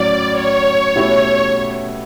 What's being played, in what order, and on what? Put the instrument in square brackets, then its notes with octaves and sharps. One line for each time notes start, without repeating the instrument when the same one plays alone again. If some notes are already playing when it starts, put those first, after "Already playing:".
Already playing: [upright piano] A2 F#3 C#4 [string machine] D5
[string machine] C#5
[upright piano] B2 A3 C#4 E4 G4